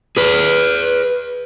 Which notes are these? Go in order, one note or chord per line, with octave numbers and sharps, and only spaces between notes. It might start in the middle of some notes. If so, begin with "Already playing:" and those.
G#4 B4